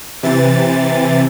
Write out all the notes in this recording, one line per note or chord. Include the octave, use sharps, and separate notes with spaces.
C3 E3 A6